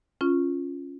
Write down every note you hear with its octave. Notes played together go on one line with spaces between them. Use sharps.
C#4 F4